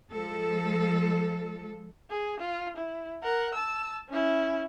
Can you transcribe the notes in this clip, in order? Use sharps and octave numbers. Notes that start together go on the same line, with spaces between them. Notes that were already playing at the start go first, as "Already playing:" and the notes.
F3 G#3 A4
G#4
F4
E4
A#4 F#5
A5 E6
C#4 E4